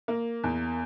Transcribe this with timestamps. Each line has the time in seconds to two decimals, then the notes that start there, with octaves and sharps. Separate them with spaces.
0.08 A#3
0.43 E2